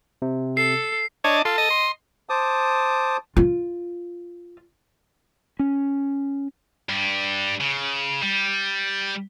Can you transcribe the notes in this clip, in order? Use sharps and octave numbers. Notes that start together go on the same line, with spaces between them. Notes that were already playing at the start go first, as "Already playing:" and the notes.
C3
A4 C7
D4 C#5 D#5 A5
F4 A4
D#5
C6
C5 A5 D6 D#6
F4
C#4
G2 G3
C#3
G3